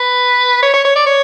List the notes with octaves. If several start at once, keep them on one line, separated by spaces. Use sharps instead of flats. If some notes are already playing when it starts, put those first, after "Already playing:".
Already playing: B4
C#5
C#5
C#5
D5
C#5